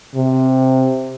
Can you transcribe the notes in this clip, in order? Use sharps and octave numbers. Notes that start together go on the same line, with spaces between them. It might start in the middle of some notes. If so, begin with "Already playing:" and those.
C3